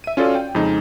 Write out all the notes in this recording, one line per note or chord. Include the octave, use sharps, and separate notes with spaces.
E5 D#7
C#4 F4 F#4 A4 D5
G5
F2 C#3 G#3 D#4